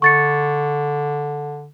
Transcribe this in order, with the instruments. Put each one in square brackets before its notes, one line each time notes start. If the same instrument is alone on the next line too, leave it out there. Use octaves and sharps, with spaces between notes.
[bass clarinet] D3 [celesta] C#6 A6 C#7